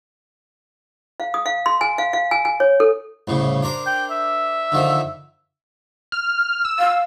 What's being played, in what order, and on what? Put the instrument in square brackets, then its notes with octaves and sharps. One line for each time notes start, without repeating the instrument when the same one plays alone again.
[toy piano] F5
D#6
F5
C6
G#5
F5
F5
G#5
G#5
C#5
A4
[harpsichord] C2 A2 C#3
D4 A#4 C5
[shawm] G5
E5
[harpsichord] D3 D#3 F3
[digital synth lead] F6
E6
[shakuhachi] F5